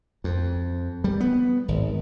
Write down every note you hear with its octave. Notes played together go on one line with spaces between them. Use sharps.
F2
G3
B3
G#1